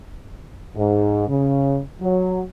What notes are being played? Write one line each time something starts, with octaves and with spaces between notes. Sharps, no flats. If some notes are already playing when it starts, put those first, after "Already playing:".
G#2
C#3
F#3